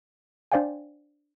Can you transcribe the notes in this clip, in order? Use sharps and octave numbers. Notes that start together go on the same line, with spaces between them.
D4 C5 D5 F5 G5 G#5